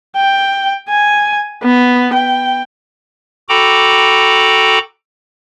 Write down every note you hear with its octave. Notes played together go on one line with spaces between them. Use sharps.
G5
G#5
B3
G5
F#4 A4 G5 A#5 B5 D6